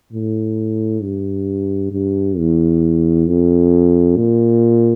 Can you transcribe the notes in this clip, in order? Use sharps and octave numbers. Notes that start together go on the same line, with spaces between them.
A2
G2
G2
E2
F2
A#2